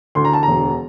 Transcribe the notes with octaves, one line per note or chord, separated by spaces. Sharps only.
D2 C6
A#5
A5
E1 A#5